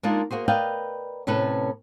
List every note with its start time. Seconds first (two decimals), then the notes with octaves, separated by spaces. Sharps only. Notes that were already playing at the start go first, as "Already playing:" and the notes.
0.03 G#3 A#3 D4 D#4 F4 A#4
0.31 A#3 F#4 G#4 C5
0.48 A#4 B4 D5 D#5 F5 G5
1.27 A2 C3 C#4 A4 B4